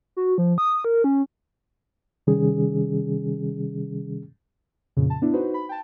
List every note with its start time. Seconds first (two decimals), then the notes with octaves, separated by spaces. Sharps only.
0.17 F#4
0.38 F3
0.58 D#6
0.85 A#4
1.04 C#4
2.27 C3 D#3 G3 C#4 G#4
4.97 F2 A#2 C#3
5.10 A5
5.22 B3 D4 E4
5.33 D#4 F#4 B4 C5
5.54 B5
5.69 G5 A5